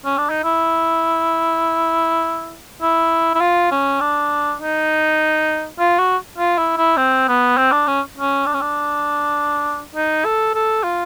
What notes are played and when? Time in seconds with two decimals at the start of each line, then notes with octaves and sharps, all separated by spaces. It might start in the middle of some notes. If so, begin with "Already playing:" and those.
0.05 C#4
0.18 D4
0.30 D#4
0.44 E4
2.82 E4
3.35 E4
3.41 F4
3.71 C#4
4.01 D4
4.60 D#4
5.80 F4
5.99 F#4
6.38 F4
6.58 E4
6.77 E4
6.97 C4
7.28 B3
7.58 C4
7.72 D4
7.88 C#4
8.17 C#4
8.46 D4
8.54 C#4
8.61 D4
9.96 D#4
10.25 A4
10.55 A4
10.84 F4